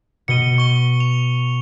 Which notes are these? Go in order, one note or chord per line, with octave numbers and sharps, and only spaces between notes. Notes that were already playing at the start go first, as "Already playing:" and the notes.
B2 C#7 D#7 G7
C#6 G7
F7